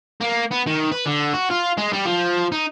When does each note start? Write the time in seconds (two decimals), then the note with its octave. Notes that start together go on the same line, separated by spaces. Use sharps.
0.21 A#3
0.52 B3
0.67 D#3
0.92 B4
1.06 D3
1.33 F#4
1.50 F4
1.78 G#3
1.93 G3
2.05 F3
2.52 D#4